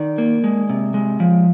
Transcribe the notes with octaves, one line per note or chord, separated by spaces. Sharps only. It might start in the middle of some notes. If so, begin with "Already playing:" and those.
Already playing: D#3 D5
A#3
G#3
C3
G#3
F3